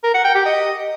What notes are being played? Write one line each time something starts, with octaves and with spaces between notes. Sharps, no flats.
A#4
F#5
G5
G4
D#5